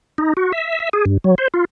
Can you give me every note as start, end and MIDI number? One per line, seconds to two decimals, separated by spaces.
0.18 0.33 63
0.37 0.52 66
0.52 0.79 76
0.80 0.89 76
0.93 1.05 68
1.05 1.18 43
1.24 1.35 54
1.38 1.48 72
1.54 1.65 65